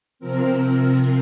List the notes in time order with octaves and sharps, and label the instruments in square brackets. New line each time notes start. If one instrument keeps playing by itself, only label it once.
[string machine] C3 F3 C4 A#4